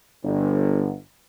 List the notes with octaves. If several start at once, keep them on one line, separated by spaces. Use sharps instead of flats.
G1